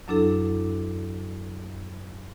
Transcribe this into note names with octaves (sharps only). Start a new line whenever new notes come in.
F#2 F#3 D4 E4 A4